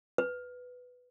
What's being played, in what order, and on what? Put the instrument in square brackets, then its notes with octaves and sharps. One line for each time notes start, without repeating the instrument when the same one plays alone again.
[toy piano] B4